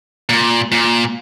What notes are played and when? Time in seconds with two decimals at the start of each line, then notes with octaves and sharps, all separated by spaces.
0.29 A#2
0.72 A#2